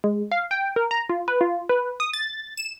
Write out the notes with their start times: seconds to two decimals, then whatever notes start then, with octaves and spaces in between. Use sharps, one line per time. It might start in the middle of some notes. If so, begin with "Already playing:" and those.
0.04 G#3
0.32 F5
0.51 G5
0.76 A#4
0.91 A#5
1.09 F4
1.28 B4
1.41 F4
1.69 B4
2.00 D#6
2.13 A6
2.57 E7